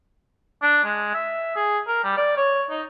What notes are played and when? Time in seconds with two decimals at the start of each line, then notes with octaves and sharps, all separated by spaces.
0.62 D4
0.84 G#3
1.14 E5
1.56 G#4
1.87 A#4
2.04 G3
2.17 D5
2.37 C#5
2.70 D#4